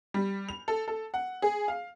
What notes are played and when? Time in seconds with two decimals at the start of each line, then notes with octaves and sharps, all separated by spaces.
0.14 G3
0.49 F7
0.68 A4
0.88 A4
1.14 F#5
1.42 G#4
1.68 F5